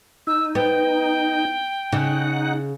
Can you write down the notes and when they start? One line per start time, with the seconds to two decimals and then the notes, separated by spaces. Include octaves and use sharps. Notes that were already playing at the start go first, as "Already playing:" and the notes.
0.27 D#4 E6
0.55 B3 G5
1.92 C#3 D#4 F#5